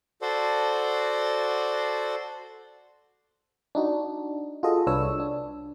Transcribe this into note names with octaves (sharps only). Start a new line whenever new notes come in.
F#4 A4 C5 D5
D4 D#4 F#4
F4 F#4 G#4 A4 D#5
C2 D4 B4 C#5 E6
D4